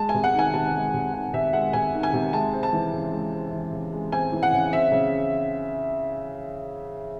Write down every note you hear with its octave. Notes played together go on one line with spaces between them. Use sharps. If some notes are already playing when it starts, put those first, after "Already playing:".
Already playing: G#3 A5
G#5
C3
F#5
D#3 G#5
C3 A5
G#3
C3
D#3 F#5
C3 E5
G#3 F#5
C3 G#5
D#3
G#5
C3
G#3 A5
C4
A5
E3
C#3
G#3
C4
E3
C#3
G#3
C4 G#5
E3
F#5
C#3
C4 E5
C#3